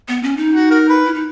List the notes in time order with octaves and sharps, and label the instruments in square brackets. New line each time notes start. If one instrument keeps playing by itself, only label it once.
[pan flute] B3
C#4
D#4
[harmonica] F#4
F#4 A#4
B4
[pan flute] E4
D#4